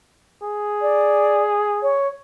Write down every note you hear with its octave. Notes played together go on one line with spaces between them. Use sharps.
G#4
D5
C#5